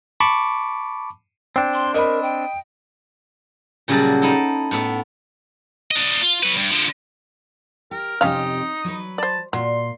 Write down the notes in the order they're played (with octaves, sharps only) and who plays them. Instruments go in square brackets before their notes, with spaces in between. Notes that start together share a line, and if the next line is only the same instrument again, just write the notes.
[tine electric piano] A5 B5 C#6 D6
[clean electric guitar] C4 D4 [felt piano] G5
[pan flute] C6
[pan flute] A#4 [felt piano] D#5 B5
[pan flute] G5
[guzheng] A#2 C#3 F#3 G3 A5
D#4 E4 A4
A2 B3 E5
[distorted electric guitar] D4 D#5
F4
F#3 B4
G2
D3 F3
[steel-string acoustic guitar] G4 [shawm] A#4
[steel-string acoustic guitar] F2 C3 G4 [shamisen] C#4 F5 [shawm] D#4
[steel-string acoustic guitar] F#3 B4
[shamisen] C5 D5 [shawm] A5
[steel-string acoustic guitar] A#2 [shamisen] F#3 [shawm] C6